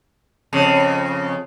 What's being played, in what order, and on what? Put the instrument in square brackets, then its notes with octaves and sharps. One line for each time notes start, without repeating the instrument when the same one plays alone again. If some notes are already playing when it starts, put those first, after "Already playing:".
[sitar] F2 C#3